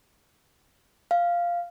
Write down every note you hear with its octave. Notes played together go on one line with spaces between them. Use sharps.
F5